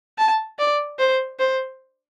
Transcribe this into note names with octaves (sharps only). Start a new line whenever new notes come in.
A5
D5
C5
C5